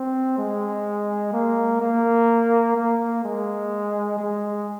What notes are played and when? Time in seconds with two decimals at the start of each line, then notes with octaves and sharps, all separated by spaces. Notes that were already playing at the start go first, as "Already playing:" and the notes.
Already playing: C4
0.38 G#3
1.33 A#3
1.81 A#3
2.76 A#3
3.24 G#3
4.19 G#3